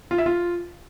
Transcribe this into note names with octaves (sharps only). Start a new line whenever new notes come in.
F4
E5
F4